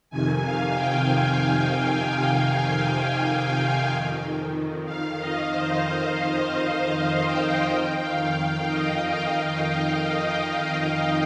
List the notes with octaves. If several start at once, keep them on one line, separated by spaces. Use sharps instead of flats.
F2 C3 D#3 G#5
F5
G5
G#5
F2 D#3
F5
D#5
C5
D#5
F5
G5
F2 D#3 G5
F5
F5
D#5
F5
F5
D#5